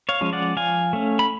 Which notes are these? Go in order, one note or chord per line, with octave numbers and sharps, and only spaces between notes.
C#5 F5
F3 G#3 C#4
D5 F#5
F3 F5 G#5
A3 C#4
B5